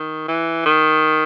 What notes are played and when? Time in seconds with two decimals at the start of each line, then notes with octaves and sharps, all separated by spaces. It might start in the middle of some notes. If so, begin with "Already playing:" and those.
Already playing: D#3
0.28 E3
0.66 D#3